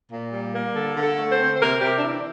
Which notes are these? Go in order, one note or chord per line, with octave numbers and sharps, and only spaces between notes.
A#2
G3
A#3
D3 A4
D3
A4
A3
C5
C4
C5
C3 A#4
C3 G4
D4
E3 E4